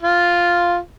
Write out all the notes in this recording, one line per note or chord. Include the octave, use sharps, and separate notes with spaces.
F4